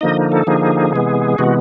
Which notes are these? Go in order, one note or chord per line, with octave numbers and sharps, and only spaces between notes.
D3 F3 A#3 D#4 D#5
A4
D3 F3 A#3 D#4 G#4
C3 E3 G#3 B3
C3 E3 G#3 B3 F#4